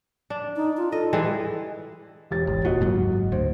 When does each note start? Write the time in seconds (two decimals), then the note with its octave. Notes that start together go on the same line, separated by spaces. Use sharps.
0.30 D4
0.56 D#4
0.77 F4
0.92 A4 D#5
1.13 E3 G3 G#3
2.31 E1 G4 A6
2.47 G#1
2.65 D#1 A#2 F#4 D#5
2.81 F#1 G#2 F#3
3.32 D2 C5